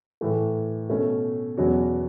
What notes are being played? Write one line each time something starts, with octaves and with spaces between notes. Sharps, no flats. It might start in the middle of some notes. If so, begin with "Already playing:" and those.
A2 E3 A3
B2 A3 C#4
E2 B2 F#3 C#4 F#4